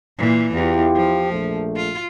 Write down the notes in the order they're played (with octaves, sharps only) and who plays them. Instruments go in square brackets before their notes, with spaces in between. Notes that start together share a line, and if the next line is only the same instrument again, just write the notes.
[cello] A#2 E3
[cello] E2 [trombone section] E4 F4 G4
[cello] F3
[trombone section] A#1 A3
[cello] F4